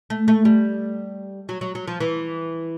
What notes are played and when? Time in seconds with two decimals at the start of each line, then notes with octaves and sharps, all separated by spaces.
0.10 A3
0.28 A3
0.45 G3
1.49 F#3
1.61 F#3
1.75 F#3
1.88 F3
2.01 E3